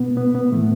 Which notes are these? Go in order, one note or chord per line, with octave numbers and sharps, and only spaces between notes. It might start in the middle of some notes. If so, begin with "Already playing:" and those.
Already playing: B2 B3
B2 B3
B3
A2 E3 A3